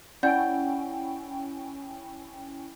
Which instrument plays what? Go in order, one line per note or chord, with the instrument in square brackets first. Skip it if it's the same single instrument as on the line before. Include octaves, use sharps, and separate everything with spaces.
[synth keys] C#4 E4 G5 [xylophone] D5 F#5 G6